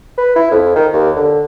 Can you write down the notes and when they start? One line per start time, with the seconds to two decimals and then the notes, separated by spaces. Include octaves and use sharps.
0.18 B4
0.36 E4
0.51 F2
0.75 D#3
0.93 D#2
1.16 D3